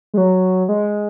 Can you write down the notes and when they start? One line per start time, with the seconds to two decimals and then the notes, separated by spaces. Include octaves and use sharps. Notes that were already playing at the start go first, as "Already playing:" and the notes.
0.14 G#3
0.17 F#3
0.69 G#3